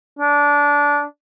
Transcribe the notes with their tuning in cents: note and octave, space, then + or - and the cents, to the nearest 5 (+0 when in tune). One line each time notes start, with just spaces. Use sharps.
D4 -20